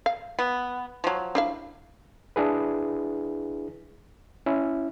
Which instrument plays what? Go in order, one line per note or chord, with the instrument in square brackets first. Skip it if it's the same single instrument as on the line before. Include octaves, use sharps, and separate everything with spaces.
[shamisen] F5
[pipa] B3
F3 F#3
[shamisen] D4 E4 F5
[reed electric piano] D4 E4 G#4 B4
C#4 E4